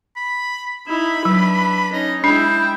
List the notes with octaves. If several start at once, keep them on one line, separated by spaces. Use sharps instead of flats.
B5
D#4 E4 B5
F#3 D4 B4
C#4 D#4 D#5
G#3 D4 E4 G5